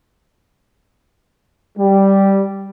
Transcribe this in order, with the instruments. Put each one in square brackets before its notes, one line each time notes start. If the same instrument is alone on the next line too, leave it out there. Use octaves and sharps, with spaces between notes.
[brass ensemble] G3